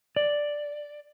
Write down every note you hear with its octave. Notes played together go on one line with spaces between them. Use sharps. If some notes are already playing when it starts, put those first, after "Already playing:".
D5